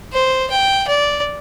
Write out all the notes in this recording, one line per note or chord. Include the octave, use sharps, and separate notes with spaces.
C5
G5
D5